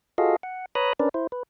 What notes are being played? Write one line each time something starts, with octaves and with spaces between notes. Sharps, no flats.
F4 F#4 G#4 A4 D#5 F5
F#5
B4 C#5 A#5 B5 D#6 F#6
C#4 D4 A#4 B4 D5
E4 C5
B4